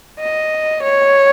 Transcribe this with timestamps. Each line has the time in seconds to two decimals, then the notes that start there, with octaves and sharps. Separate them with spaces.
0.19 D#5
0.82 C#5